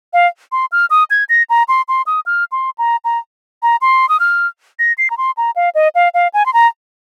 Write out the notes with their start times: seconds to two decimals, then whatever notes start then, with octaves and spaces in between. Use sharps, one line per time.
0.13 F5
0.52 C6
0.72 F6
0.90 D#6
1.10 G#6
1.29 A#6
1.50 A#5
1.68 C6
1.88 C6
2.07 D#6
2.26 F6
2.52 C6
2.78 A#5
3.05 A#5
3.63 A#5
3.81 C6
4.09 D#6
4.20 F6
4.79 A#6
4.98 C7
5.10 A#5
5.18 C6
5.37 A#5
5.56 F5
5.75 D#5
5.95 F5
6.14 F5
6.34 G#5
6.46 C6
6.53 A#5